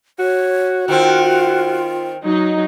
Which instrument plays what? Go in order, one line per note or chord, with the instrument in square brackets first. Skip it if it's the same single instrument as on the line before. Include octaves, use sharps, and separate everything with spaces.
[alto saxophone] F#4 [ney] C#5
[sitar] D#3 C4 [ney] F4
[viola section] F#3 D#4